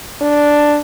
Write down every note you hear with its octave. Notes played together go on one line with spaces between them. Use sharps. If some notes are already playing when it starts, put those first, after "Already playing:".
D4